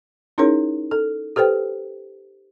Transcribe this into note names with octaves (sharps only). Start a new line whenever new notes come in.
C#4 D#4 E4 G#4 A#4 C#5
A4
G4 A4 B4 C5 G5